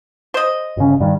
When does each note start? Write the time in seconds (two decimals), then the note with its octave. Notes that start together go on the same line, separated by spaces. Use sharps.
0.34 C5 D#5
0.77 G1 C#3
1.00 G2 D#3